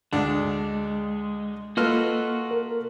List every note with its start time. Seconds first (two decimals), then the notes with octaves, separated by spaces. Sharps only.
0.13 D2 G#3 D4
1.77 A#3 F4 F#4 A4 B4 D#5 F6
2.51 A#4